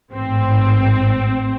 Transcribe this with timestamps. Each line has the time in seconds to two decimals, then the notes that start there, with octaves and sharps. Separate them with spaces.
0.11 A1 G#2 C4